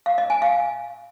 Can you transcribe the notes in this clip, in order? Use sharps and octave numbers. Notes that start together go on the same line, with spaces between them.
F5
D#5
G#5
F5